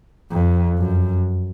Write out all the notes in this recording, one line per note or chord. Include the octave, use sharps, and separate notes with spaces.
F2
F#2